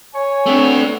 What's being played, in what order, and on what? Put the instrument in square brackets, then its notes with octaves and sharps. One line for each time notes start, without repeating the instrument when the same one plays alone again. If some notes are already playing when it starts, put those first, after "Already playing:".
[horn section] C#5 G#5
[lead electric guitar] A3 D4 [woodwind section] B3 C4